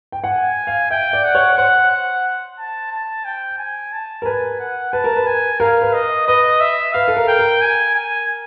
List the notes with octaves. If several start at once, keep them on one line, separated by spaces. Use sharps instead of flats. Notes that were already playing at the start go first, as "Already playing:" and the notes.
G5
F#5 G#5
F5
E5 G5
D5
F#5
C#5
C5 F#5
F#5
A5
A5
G5
G#5
A5
A#4
B4 G#5
F#5
B4 A5
A#4
B4
G#5
A#4 F5
B4
D#5
B4 D#5
E5
B4 F5
A4
A#4
G5
A#4
G#5
G#5